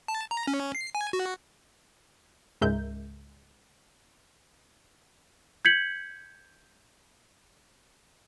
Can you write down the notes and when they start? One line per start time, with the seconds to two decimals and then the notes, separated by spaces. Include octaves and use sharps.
0.08 A5
0.31 A#5
0.47 C#4
0.75 C7
0.95 G#5
1.13 F#4
2.61 C#2 G#2 G#3 A#4 E5 G6
5.65 G6 G#6 B6 C#7 F#7